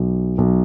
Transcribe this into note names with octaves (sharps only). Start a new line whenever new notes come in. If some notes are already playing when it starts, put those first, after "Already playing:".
Already playing: B1
B1